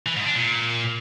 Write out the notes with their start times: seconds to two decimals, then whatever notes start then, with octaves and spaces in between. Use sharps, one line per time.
0.06 E3
0.16 G#2
0.26 D4
0.36 A#2